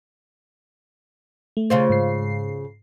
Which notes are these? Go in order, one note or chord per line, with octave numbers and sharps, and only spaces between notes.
A3
C#3 F4 C5
G#2 C7